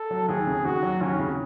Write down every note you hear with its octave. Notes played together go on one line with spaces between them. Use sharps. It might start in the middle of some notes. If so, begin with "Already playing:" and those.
Already playing: A4
F#3
D#2 G#4
C#3
D#2 F#4
F#3
D#2 C#4
C#3